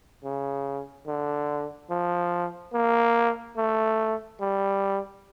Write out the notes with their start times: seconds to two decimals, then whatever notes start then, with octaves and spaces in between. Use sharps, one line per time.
0.24 C#3
1.07 D3
1.90 F3
2.74 A#3
3.57 A3
4.41 G3